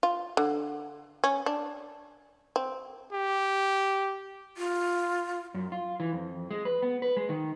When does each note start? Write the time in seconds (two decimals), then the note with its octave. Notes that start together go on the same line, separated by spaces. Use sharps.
0.03 F4
0.37 D3
1.24 C#4
1.46 D4
2.56 C4
3.12 G4
4.57 F4
5.54 F#2
5.72 F4
6.00 E3
6.13 F2
6.51 G#3
6.65 B4
6.82 B3
7.02 B4
7.17 G#3
7.29 D#3